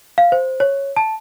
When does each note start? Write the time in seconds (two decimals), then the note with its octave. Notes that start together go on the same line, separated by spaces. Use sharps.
0.18 F5
0.32 C5
0.60 C#5
0.97 A5